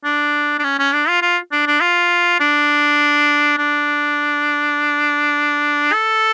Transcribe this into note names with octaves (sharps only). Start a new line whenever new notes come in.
D4
D4
C#4
C#4
D4
F4
F4
D4
D4
F4
D4
D4
A4